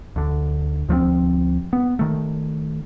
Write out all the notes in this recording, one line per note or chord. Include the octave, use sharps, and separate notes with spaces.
D2 D3
D2 F3 A3 C4
B3
D#3 A3